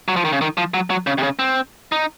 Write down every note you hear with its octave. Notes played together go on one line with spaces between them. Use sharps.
F#3
F3
D#3
C#3
D#3
F3
F#3
F#3
C#3
C3
C#3
C4
D#4